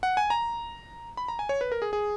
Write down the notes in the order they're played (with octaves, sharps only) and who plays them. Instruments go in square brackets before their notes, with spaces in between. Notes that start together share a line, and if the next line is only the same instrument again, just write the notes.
[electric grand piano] F#5
G#5
A#5
B5
A#5
G#5
C#5
B4
A#4
G#4
G#4